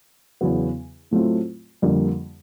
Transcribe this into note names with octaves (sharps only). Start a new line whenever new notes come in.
E2 C#3 F#3 B3
A2 F#3 A3 C4 F4
F2 D3 G3 A#3